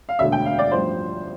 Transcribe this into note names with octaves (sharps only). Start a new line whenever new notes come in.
F5
E1 D2 D3 E5
G5
F5
D5
A1 G2 F3 C5